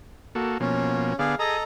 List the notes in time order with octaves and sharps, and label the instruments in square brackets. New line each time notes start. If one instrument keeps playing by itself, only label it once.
[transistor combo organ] A#3 F#4 A4
[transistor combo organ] B2 F3 A#3 [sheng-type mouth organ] C#4
[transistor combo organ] D3 B3 D5 [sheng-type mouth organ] G#4 F5
[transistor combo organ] G#4 D#6 [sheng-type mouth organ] A4 D#5 A#5